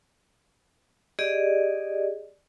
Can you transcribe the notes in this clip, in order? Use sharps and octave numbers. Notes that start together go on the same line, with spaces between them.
G4 G#4 D5 D#5